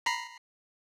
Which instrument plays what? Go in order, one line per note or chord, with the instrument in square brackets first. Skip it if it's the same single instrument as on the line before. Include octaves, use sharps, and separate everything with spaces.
[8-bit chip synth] A#5 B5 C7